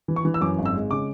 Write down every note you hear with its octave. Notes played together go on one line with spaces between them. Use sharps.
E3
C#6
E3
E6
F#2 D6
G#1
E6
G#3
C#3 D6